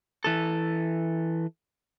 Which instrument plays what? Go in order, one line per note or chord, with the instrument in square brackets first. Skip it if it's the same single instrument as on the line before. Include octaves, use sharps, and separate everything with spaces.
[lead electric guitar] E3 A4